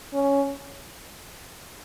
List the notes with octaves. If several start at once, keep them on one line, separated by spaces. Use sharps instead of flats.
C#4